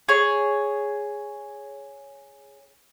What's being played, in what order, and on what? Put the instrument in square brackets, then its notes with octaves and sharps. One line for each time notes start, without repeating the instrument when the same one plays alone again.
[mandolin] G#4 C#5